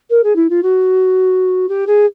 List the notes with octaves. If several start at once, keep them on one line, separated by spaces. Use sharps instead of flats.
A#4
G#4
E4
F4
F#4
G4
G#4